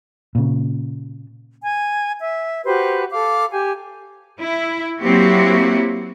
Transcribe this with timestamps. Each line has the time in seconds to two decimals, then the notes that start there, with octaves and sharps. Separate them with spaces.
0.35 A#2 C#3
1.63 G#5
2.21 E5
2.65 F#4 G4 B4 C5
3.10 A4 F5 D6
3.51 G4 G#5
4.40 E4
5.01 F#3 A#3 C4 E4 F#4 G4